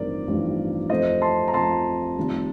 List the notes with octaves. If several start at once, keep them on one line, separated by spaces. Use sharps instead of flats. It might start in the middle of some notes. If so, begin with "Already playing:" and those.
Already playing: A1 G2 F3 C4 D#4 A#4 D5
A1 G2 F3 C4 D#4
F2 C3 F3 A3 C5 D#5
A5 C6
A#5
F2 C3 F3 A3 A5 C6
F1 F2 D#3 G3